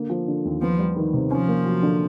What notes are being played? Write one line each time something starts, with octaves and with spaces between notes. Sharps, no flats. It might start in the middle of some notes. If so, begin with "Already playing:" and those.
Already playing: D3 A#3
F3
D3
D#2
F3 B3
G3
D#3
C3
F3 C#4
A#3
F#3
D3